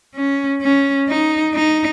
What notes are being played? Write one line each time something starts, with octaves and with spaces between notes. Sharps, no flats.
C#4
C#4
D#4
D#4